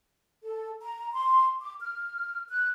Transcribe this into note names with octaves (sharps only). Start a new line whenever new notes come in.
A4
A#5
C6
D6
F6
F#6